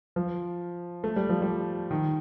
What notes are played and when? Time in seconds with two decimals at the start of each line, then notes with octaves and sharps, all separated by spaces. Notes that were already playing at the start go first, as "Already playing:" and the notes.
0.16 F3
1.04 A3
1.16 G3
1.29 F3
1.42 G3
1.91 D#3